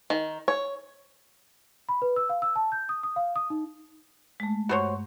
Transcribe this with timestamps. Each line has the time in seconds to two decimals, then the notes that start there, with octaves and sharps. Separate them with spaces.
0.10 D#3
0.48 C#5
1.89 B5
2.02 B4
2.16 E6
2.29 F5
2.42 E6
2.56 A5
2.72 G6
2.89 D#6
3.03 D#6
3.16 F5
3.36 D#6
3.50 D#4
4.40 G#3 A3
4.69 G2 F#4 C5 C#5